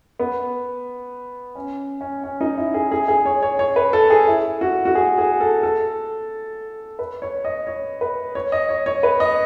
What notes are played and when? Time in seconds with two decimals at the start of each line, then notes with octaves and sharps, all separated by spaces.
0.19 B3
1.55 C#4
2.01 C#4
2.24 C#4
2.41 D#4
2.57 E4
2.74 G#4
2.91 G#4
3.08 G#4
3.26 C#5
3.43 C#5
3.59 C#5
3.76 B4
3.93 A4
4.10 G#4
4.28 E4
4.61 F#4
4.85 F#4
4.95 G#4
5.18 G#4
5.41 A4
5.63 A4
6.99 B4
7.22 C#5
7.45 D#5
7.67 C#5
8.01 B4
8.35 C#5
8.52 D#5
8.69 C#5
8.86 C#5
9.03 B4
9.20 D#5